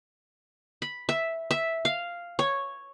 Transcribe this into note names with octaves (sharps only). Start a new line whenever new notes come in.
B5
E5
E5
F5
C#5